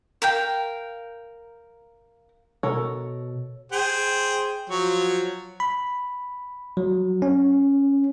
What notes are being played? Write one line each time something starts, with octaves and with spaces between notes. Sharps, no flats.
A#4 F5 G5
B2 A4 A#4 C#5
G#4 C5 G5
F3 F#3 C#5
B5
F#3
C#4